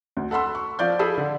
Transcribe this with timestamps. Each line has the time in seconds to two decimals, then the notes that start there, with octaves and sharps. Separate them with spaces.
0.17 D2
0.31 A4 F#5 B5 C6 E6
0.55 C#6
0.79 F3 D5 F5 G6
0.99 G#4 A4 A5 B5
1.17 D3